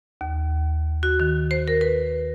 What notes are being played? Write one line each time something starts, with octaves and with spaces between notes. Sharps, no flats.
D#2
F#4
D#3
C5
A#4
B4